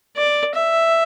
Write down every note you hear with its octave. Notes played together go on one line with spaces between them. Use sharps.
D5
E5